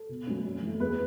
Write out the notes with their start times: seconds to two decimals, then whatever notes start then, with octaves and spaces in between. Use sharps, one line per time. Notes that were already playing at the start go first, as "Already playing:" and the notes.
Already playing: A4
0.09 B2
0.27 F#3 A3 C#4
0.44 F#2
0.62 E3 A3
0.80 E2 G#4 B4